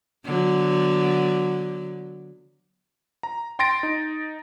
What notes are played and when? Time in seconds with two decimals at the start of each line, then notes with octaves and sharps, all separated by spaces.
0.24 D3 F#3 B3
3.23 A#5
3.59 G5 C6 A6 A#6 D7
3.83 D#4